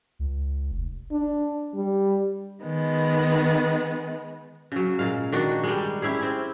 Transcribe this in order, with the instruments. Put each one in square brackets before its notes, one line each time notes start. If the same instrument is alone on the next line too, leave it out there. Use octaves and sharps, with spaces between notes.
[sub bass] C#2
F1
[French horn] D4
G3
[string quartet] D#3 G#3 B3
[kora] C#3 F#3
A#2 G#3 F5
D#3 D4 F#4
G3 G#3
C#4 E4 G4 G#4
C4